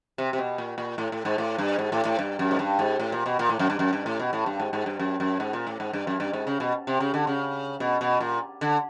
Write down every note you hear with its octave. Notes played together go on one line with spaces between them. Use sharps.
C3
C3
B2
A#2
A#2
A2
A2
G#2
A2
G2
G#2
A2
A2
G2
F#2
G#2
G2
G#2
A2
A#2
B2
A#2
A2
F#2
G2
F#2
G2
A2
B2
A2
G2
G#2
G#2
G2
F#2
F#2
G#2
A#2
A2
G#2
G2
F#2
G2
G#2
C#3
B2
C3
C#3
D3
C#3
B2
B2
A#2
D3